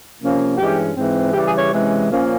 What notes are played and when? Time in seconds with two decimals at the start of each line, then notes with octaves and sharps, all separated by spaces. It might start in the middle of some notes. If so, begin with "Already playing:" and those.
0.20 C3 F3 A#3 C#4
0.58 G2 E3 G#3 C#4 G4
0.95 G#2 E3 G#3 C4
1.33 C#3 E3 G3 G4
1.46 G#4
1.58 C#5
1.71 C3 E3 G#3 C#4
2.10 A#2 F3 A#3 C#4